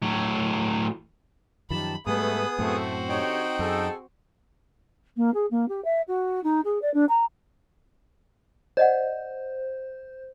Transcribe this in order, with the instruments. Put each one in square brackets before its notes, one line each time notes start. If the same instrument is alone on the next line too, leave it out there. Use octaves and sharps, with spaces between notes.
[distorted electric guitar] A2 F#3
[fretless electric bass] F#2 D#3 F3 [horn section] D#4 G4 A5 [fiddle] B5
[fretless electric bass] G#2 G3 [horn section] A3 [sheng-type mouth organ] B3 G#4 D#6 [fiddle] B4
[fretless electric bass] F#2 A2 [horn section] A3 [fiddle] C4 F#4
[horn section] D3 G4 C#5 [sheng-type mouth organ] D#4 G5
[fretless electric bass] F#2 [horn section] G#4 A4
[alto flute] A#3
G#4
A#3
G4
E5
F#4
D#4
G#4
D5
D4
A#5
[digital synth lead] C5 [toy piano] D5 D#5 F#5